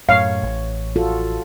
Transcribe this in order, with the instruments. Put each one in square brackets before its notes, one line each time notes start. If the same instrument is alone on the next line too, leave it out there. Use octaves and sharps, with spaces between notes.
[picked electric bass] F#2 A2 [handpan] C#5 [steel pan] F5
[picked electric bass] A1
[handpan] F4 F#4 A4